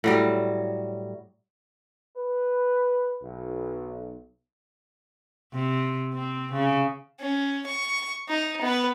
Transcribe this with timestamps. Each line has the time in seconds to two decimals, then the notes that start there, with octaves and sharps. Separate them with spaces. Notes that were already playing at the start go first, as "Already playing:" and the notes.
0.04 A2 F#3 G3
2.17 B4
3.23 B1
5.54 C3
6.13 C4
6.53 C#3
7.20 C#4
7.66 C#6
8.28 D#4
8.62 B3 B4